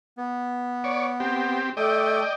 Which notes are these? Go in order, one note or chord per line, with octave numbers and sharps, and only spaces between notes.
B3
C#5 D5
C4 G4
A3 A4 D5 D#5 G5